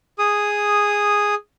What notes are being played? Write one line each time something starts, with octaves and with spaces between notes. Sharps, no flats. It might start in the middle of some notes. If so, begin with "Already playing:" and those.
G#4 D#6